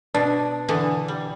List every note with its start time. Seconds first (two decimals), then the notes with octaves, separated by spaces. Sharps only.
0.15 B2 D4
0.69 D3 E3 B3
1.08 G3